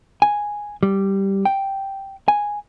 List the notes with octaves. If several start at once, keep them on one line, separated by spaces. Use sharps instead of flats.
G#5
G3
G5
G#5